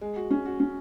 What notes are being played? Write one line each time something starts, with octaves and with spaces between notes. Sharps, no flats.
G#3
F#4
C#4
F#4
C#4